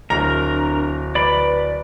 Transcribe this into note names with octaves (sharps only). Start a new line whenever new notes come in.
D1 D4 A#4 A#5
B4 D5 B5